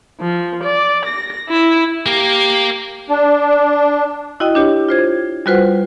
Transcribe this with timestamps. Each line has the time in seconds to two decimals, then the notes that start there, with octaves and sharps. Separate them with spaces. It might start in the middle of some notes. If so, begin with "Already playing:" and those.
0.19 F3
0.63 D5
1.05 A#6
1.49 E4
2.06 A#3 G4 A#4
3.09 D4
4.40 E4 F#4 D#5 G5 D#6
4.55 D4 G4 C#5
4.89 F4 C5 G#6
5.46 G3 F4 F#4 B4 C5 F#5